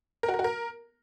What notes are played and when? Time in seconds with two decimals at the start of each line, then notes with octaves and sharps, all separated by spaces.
0.23 A#4
0.28 F#4
0.34 A#4
0.39 F#4
0.44 A#4